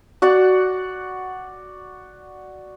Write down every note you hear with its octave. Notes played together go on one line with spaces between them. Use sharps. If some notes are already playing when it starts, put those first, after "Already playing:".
F#4 D5 F#5